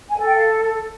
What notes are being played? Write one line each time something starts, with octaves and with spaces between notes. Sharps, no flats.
G#5
A4
G5
F5